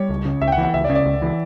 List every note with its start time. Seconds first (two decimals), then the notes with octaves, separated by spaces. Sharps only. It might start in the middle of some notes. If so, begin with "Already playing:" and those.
Already playing: G3 C#5
0.10 C#2
0.25 C#3
0.41 C#2 E5
0.48 G5
0.52 F#5
0.58 E3
0.63 F#5
0.74 C#2 E5
0.84 D5
0.90 C#3
0.95 D5
1.06 C#2
1.22 E3